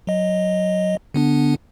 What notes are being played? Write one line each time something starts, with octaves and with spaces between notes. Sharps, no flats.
F#3 D#5
D3 B3 D4